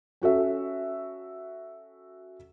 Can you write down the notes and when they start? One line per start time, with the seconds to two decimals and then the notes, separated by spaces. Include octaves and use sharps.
0.22 C#4 F#4 A4 E5